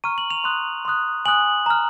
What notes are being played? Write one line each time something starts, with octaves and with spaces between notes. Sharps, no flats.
A#5 C#6 F6 D#7
F#7
F7
C6 D#6 F#6
C6 D#6 F#6
G#5 D#6 F#6 F#7
A#5 F6